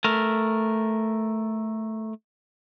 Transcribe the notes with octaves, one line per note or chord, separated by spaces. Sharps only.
A3 A#4